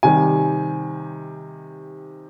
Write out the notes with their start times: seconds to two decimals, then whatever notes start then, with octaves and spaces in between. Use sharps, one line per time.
0.03 C3 D#3 G3 G#5